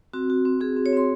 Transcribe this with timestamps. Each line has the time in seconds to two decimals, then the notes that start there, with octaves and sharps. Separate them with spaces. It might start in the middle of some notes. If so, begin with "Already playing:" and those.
0.13 C4 F#4
0.30 F#4
0.45 C4
0.61 C4 G#4
0.76 C4
0.86 C#5
0.93 C4 C6